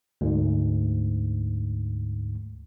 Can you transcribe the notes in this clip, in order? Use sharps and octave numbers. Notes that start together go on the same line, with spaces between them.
D2 G#2